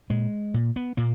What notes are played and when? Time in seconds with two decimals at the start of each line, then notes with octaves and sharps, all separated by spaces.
0.10 A#2 G#3
0.54 A#2
0.76 B3
0.97 A#2 A#3